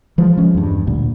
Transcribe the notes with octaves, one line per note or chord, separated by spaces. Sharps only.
E3 F3 G#3
F3 G#3 C#4
E2 G2
D2 A#2